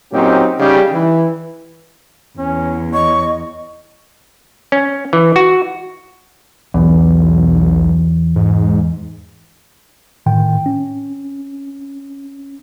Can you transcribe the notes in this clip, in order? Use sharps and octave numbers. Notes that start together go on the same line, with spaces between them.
A#2 F#3 C4 C#4 D#4 G4
C#3 G3 C#4 D#4 G4
E3
E2 C#4
C#5 D#5 C#6
C#4
E3
F#4
B1 E2
G#2
A2 D#3 G5
C#4